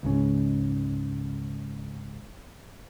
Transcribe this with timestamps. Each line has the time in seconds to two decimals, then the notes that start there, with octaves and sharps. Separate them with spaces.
0.03 C#2 G#2 C#3